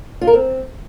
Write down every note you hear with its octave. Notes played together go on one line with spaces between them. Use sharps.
F4
A#4
C4